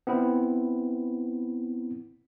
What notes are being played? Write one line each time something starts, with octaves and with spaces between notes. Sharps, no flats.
B3 C4 E4